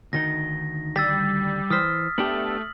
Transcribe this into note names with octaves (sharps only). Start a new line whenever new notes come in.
D2 D#3 D#4 A#6
G3 E6 A6 B6
E3 C5 D#6 F6 B6
A3 B3 D4 G4 F#7